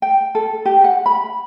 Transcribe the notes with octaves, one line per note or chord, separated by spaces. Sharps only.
G5
A4
G4
F#5
B5